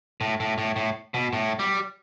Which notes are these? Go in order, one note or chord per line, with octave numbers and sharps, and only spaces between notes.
A2
A2
A2
A2
B2
A2
G3